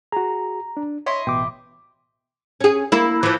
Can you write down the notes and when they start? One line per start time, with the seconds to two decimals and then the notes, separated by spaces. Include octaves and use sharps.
0.12 F#4 G#4 A#5
0.77 D4
1.06 E4 C#5 D#5 C6
1.27 A1 B2 G5 D6
2.61 C#4 G#4
2.92 A#3 E4
3.23 E3 F3